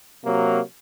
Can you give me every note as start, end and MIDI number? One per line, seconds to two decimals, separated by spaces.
0.25 0.60 48
0.25 0.60 54
0.25 0.60 58